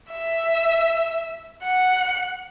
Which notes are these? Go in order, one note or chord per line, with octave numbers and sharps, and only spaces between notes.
E5
F#5